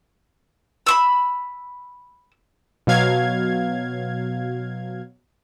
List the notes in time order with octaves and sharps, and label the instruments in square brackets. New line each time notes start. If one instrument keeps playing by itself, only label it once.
[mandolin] B5 C#6 E6
[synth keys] B2 F#3 F5 G#6